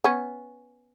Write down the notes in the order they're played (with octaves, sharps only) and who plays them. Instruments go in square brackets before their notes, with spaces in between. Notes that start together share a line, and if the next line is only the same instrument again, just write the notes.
[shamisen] B3 C#4